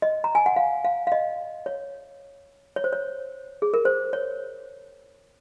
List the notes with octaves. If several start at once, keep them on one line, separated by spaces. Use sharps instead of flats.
D#5
A#5
G#5
F#5
F5
F5
F5
D#5
C#5
C#5
C5
C#5
G#4
A#4
C5
C#5